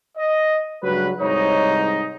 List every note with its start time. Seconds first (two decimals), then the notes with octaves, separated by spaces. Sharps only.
0.17 D#5
0.83 C#2 G2 F#3 B4
1.21 C2 G#2 D#4 C#5